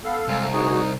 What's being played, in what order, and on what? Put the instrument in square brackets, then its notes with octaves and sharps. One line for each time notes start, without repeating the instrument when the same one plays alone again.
[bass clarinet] B3 [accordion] A4 F5
[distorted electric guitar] C2 [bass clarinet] G#3
[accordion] D2 F#4 G#4 [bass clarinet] D#4